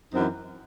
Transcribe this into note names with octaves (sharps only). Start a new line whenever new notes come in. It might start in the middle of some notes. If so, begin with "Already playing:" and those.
F#2 E3 C4 D#4